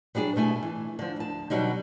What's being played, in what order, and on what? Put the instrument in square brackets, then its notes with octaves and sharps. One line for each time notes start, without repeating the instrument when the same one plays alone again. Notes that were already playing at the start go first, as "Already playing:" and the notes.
[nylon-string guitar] F#3 G3 D4 G#4 D5
B2 A3 E4 G#5
E3
D3 F3
D2 A5
B2 D3 F#3 G3 D#4